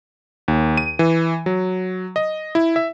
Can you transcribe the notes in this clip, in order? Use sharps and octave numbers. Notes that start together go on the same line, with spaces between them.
D#2
D#7
E3
F#3
D#5
E4
E5